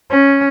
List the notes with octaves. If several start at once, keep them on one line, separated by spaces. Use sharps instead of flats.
C#4